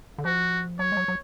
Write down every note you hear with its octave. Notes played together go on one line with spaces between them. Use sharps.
D3
F3 F#4
F#3 C#5
G#3
F#3
F#3